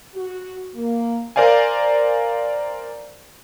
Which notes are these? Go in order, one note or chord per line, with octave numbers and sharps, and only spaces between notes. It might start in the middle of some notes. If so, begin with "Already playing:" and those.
F#4
A#3
A#4 C5 D5 F5 G#5